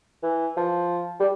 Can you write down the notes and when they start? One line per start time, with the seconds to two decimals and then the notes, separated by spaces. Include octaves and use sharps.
0.23 E3
0.57 F3
1.20 G3